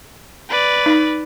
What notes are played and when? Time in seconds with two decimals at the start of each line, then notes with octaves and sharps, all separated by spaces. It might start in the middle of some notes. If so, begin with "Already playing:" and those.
0.49 B4 D5
0.86 D#4